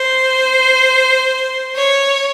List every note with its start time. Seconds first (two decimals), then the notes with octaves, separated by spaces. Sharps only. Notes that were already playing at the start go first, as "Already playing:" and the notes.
Already playing: C5
1.76 C#5